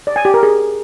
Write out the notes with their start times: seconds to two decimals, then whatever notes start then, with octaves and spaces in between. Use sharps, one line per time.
0.07 D5
0.16 G#5
0.25 G4
0.34 A#4
0.43 G#4